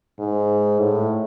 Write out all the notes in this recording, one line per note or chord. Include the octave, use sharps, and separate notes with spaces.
G#2
A2